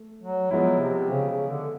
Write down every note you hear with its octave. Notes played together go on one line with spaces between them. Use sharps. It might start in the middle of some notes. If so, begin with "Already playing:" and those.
Already playing: A3
F#3
F3 F#3 G#3 B3 E4
C3
C#3
C#3
D3